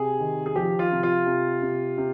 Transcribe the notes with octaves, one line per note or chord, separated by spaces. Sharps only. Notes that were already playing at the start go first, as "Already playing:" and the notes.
Already playing: C3 G#4
D#3
G#4
F3 G4
F4
C3
F4
C3
C3
C3